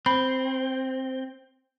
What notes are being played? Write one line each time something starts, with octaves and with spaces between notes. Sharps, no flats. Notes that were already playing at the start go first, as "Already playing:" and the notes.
C4 B5